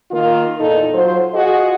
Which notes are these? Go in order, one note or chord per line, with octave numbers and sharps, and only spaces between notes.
D#3 A#3 F4 A#4
E2 A#2 D#4 A4
F#3 F4 C5
F4 F#4 G#4 D#5